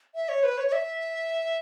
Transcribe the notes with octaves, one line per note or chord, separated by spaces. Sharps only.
E5
C#5
B4
C#5
C#5
E5